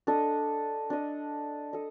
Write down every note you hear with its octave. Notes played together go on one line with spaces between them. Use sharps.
D4 A4 D#5
D4 A4 D#5
A4 D#5